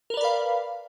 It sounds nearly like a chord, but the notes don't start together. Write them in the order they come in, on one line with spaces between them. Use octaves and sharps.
A#4 B4 D5 B5 F5